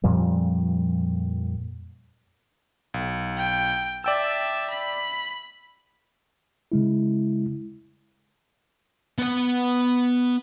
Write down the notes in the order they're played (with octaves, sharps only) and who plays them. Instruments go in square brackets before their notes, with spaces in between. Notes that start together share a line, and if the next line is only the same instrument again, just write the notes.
[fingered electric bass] F2 A#2 F3 G3
[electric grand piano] B1
[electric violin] G5
[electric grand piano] D5 G5 E6 [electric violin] E5 A5
[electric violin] B5
[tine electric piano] C#3 G#3 E4
[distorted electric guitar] B3 F#5